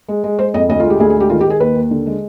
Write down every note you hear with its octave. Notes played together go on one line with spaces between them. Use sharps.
G#3
G#3
G#3 C5
F2 D#5
D2 D#5
F4
G#3 G4
D2 G#4
G#4
G#3
G4
D#3 F4
G4
D#3 G#4
D#2 B4
D#2
D3
G#3